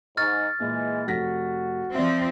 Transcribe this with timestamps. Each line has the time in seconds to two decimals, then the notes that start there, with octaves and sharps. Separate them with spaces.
0.17 G#2 D#4 C#6 F6 A6
0.60 A#2 E3 G#3
1.08 F1 F#4 A#6 B6
1.94 F3 C4 D5 E5